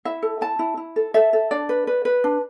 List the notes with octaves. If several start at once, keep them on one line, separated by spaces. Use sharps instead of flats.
E4 E5
A4
E4 A5
E4
E4
A4
A4 E5
A4
D4 D5
B4
B4
B4
D4